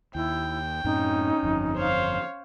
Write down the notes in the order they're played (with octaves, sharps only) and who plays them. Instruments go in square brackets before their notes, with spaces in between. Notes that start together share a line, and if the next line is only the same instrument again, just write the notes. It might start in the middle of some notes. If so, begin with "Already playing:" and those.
[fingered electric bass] D#2 [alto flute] E4 [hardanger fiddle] G5
[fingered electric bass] F#2 A2 C4 [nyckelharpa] C#4 [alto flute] D#4
[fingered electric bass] G1 F2
[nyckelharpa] C5 F5 [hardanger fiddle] C#5